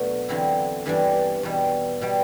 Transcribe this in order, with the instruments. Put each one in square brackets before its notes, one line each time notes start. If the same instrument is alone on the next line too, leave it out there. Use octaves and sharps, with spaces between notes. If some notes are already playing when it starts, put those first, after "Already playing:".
Already playing: [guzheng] B2 F#3 A3 D4
E2 D3 F#3 C4 E4
G2 E3 G3 D4
E2 B2 G3
B2 G3